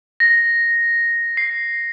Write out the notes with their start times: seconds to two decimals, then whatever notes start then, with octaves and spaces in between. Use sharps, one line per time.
0.20 A#6
1.37 C7